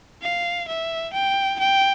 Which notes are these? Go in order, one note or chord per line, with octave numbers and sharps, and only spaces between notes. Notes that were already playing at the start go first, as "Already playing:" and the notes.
F5
E5
G5
G5